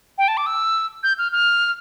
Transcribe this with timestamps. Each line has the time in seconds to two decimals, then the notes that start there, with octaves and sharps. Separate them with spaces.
0.18 G5
0.28 A5
0.37 D6
0.46 E6
1.03 G6
1.18 F6
1.32 F6